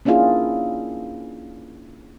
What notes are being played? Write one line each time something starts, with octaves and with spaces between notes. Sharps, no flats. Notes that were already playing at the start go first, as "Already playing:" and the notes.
A#3 C#4 D4 E4 F4 G#4